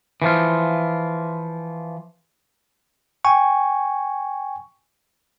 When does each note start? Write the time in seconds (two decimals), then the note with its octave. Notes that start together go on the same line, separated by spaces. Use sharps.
0.22 E3 F3 F4
3.25 G5 G#5 C#6